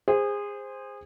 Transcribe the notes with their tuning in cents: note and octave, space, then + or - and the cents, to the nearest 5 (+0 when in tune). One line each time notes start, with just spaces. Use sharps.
G#4 -25 C5 +0